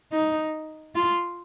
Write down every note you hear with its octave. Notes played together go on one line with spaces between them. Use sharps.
D#4
F4